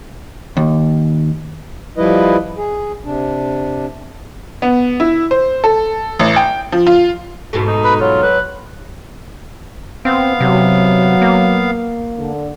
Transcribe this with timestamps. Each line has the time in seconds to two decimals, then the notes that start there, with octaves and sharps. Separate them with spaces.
0.57 D#2
1.98 F3 G3 E4 B4 D#5
2.57 G#4
3.04 C3 D4
4.62 B3
5.00 E4
5.31 C5
5.64 A4
6.19 A1
6.36 G5
6.72 F3
6.87 F4
7.53 G#2 B2 A3
7.67 D#4
7.84 B4
8.00 F#3 F4
8.23 B4
10.05 B3 C4 F5
10.40 C3 F#3
11.21 A#3
12.19 D3